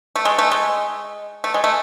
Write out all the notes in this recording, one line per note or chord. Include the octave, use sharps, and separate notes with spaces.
A3
G#3
A3
G#3
A3
G#3
A3